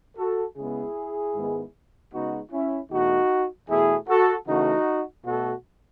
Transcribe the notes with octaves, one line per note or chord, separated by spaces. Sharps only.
F#4 A4
C#3 G#3 B3 E4 G#4
G#2 D#3 G#3 B3
C#3 G#3 B3 D#4 F#4
C#4 E4
E2 B2 A3 D#4 F#4
E2 B2 A3 E4 G#4
F#4 A4
C#3 E3 A3 D#4 F#4
B2 A3 F#4 A4